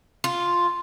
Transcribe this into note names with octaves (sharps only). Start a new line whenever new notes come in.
F4